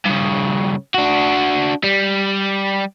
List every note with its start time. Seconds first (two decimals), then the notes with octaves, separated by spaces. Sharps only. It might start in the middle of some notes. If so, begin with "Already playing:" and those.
0.06 G2 C#3
0.94 D4 F#4
1.84 G3